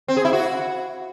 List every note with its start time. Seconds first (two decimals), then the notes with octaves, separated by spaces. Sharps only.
0.08 C4
0.17 G#4
0.25 E4
0.33 F#4